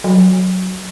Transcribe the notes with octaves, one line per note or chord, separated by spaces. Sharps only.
F#3